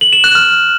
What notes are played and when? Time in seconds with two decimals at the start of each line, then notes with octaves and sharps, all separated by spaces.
0.01 F#7
0.13 E7
0.24 F#6
0.35 F6